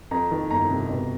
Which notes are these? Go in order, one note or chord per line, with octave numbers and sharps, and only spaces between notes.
F2 A#5
D#3
G1 A#5
C3
B2